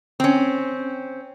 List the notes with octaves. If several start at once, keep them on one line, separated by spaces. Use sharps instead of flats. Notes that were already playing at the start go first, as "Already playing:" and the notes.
C4 C#4